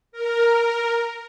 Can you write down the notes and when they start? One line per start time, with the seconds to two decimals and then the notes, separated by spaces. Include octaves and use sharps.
0.12 A#4